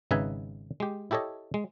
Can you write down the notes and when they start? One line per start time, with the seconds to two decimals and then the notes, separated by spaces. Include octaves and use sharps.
0.11 G#1 C#3 D#4 B4 E5 G#5
0.80 G#3 G4
1.11 E4 G4 A4 C#5 D#5
1.54 G#3